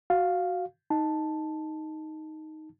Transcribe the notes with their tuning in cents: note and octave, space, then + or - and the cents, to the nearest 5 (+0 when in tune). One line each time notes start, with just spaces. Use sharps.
F#4 +0 F5 +0
D#4 +5 A5 +0